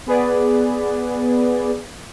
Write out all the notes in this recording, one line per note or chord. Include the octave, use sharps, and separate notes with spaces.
B3 G#4 B4 D5